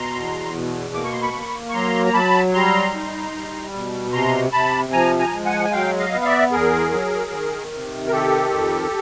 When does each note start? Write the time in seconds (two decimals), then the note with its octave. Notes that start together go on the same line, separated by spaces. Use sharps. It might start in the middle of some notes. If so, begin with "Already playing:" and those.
Already playing: B2 A#5 C6
0.15 E2
0.54 B2
0.94 A#3 D6
1.04 C#6
1.13 C6
1.21 B5 C#6
1.34 A#3
1.70 C#6
1.74 F#3 A#5 C6
2.06 A#5
2.13 F#3 A5 B5
2.53 G3 A#5 C6
2.93 D#4
3.34 G3
3.73 B2
4.13 C3 A#5 C6
4.52 C3 A5 B5
4.92 F3 G#5 A#5
5.19 G#5 A#5
5.33 G#3
5.46 F#5 G#5
5.65 G#5
5.72 F#3 F5 G5
5.99 D#5 F5
6.12 B3
6.21 F5
6.26 D5 E5
6.52 E2 G#4 A#4
6.92 F#3
7.31 D#3
7.72 C3
8.07 A#4
8.11 D#3 G4 A4
8.51 F2